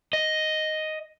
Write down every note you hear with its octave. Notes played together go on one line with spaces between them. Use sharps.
D#5